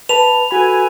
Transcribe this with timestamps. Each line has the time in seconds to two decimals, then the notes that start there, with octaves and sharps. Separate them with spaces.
0.09 B4 A5 B5 F7
0.51 F#4 A4 B4 G#5 B5